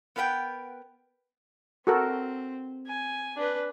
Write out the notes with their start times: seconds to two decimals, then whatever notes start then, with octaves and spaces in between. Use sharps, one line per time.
0.16 B3 A#4 B4 F#5 G5
1.87 C4 F#4 A4 A#4
2.87 G#5
3.37 D4 B4